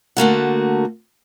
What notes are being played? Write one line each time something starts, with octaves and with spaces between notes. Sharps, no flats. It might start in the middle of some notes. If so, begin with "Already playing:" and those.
D3 A3 A#3 F#4